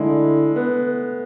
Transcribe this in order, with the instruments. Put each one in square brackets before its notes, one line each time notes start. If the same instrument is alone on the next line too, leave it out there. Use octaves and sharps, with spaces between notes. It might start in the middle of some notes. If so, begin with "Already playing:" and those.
Already playing: [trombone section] D3 A3 E4 [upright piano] G#3
[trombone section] A3 [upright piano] B3